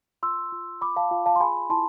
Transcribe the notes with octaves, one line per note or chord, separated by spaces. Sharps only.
F4 C6 E6
F4
F4 B5 D6
F5 A5
F4 F5
F5 A5
C6
G#4 G#5 B5
E4 A5 C6